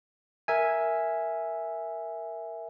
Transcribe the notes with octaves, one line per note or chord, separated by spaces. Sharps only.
A#4 E5 G#5